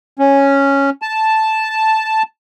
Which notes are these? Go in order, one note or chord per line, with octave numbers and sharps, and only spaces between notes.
C#4
A5